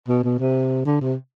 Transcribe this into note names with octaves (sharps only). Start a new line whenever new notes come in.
B2
B2
C3
D3
C3